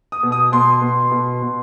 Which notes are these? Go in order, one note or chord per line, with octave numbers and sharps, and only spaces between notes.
D#6
B2
D#6
B2 C6
B2
B2
B2